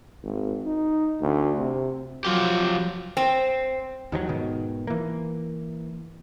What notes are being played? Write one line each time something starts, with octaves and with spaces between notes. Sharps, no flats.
G#1
D#4
D2
C3
F3 F#3 F4 G4
C4
D#2 D#3 E3 F#3
G#2 B2 D#3
E3 A#3